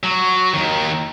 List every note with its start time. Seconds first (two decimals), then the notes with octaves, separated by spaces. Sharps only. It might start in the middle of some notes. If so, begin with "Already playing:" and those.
0.03 F#3
0.54 D#2 D#3